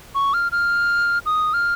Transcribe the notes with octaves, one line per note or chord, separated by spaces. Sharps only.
C#6
F6
F6
D#6
F6